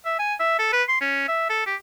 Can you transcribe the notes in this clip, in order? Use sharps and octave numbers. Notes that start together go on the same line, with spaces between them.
E5
G#5
E5
A4
B4
C6
C#4
E5
A4
G4